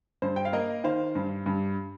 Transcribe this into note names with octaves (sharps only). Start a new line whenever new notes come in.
G2 C5
G5
F5
A#3 A#4 D#5
D#3 C5 F5
G2
G2